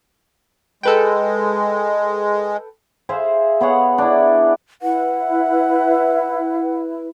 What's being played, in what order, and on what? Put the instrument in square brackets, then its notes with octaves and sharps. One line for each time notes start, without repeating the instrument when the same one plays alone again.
[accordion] G#3 [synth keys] A4 B4 G5
[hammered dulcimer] G#4 C5 E5 F5
B3 G#4 C#5 F#5
D4 E4
[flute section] E4 B4 [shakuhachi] F#5